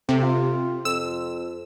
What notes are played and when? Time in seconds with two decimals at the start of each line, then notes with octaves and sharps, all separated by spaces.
0.09 C3 A3
0.23 F4
0.85 F2 E6